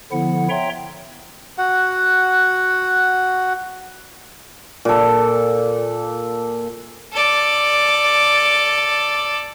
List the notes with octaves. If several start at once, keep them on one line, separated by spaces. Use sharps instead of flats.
D3 F3 B3 E4 F#5
C#5 E5 G5 A#5 C6
F#4 F#5
A#2 A4
A4 D5